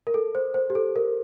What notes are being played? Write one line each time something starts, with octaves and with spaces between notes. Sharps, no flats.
A#4
A4
C5
C5
G4
A4
A#4